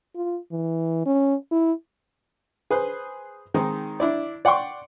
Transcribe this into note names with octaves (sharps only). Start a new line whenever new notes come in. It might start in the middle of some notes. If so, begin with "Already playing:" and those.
F4
E3
C#4
E4
G#4 B4 C5
D#3 G#3 C4 D#4
D4 E4 D5
D5 F#5 G5 C6 C#6